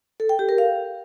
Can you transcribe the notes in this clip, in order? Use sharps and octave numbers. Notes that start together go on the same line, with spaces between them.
A4
G5
G4
A#4
F5